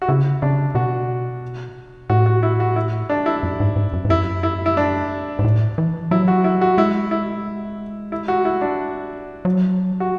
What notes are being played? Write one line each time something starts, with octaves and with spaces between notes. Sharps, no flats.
F#4
C#3 E4
C#3 D4
B2 F#4
A2 F#4
F#4
E4
F#4
E4
D4
E4
F#2
G#2
G#2
F#2
G#2
F#2 E4
E4
E4
D4
G#2
A2
E3
F#3 E4
F#4
E4
F#4
G#3 E4
E4
E4
F#4
E4
D4
F#3
F#4